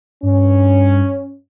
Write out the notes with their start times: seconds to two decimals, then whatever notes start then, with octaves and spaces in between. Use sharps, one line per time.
0.23 G2 C#4